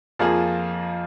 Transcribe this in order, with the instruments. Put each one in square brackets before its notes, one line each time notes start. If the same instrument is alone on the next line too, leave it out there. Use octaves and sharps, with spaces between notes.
[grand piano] F2 F3 A#3 F4 G#4